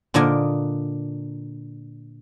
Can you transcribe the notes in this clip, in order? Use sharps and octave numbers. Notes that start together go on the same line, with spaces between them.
A#2 D3 D4 A#4 D#5 G#5